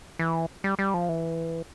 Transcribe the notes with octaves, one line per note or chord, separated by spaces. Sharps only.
E3
G3
G3
F3
E3